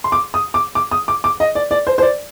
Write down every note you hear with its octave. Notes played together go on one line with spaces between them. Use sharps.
C6
D6
D#6
D6
D6
D#6
D6
D6
D#5
D5
D5
C5
C5
D5